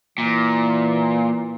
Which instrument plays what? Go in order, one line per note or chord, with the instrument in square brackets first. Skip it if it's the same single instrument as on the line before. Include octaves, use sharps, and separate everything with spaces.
[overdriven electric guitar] A#2 [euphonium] E3